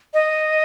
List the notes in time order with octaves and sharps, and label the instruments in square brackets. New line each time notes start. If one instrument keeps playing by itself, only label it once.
[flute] D#5